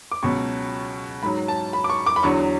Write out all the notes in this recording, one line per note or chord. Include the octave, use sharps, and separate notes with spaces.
D6
C#2 B2 F#3 C#6
G#2 F#3 B5
A5
B5
D6
C#6
D6
B5
E2 D3 F#3 C#6